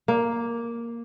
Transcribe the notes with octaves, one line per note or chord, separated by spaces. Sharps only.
A#3